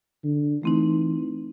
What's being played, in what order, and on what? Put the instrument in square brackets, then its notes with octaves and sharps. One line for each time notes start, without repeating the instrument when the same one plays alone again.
[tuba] D3
[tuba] E3 [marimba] A3 C4 D#4